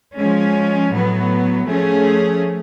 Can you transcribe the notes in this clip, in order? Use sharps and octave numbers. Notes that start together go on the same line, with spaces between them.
F3 G#3 C#4
A2 F#3 B3
F3 A3 C#4 G#4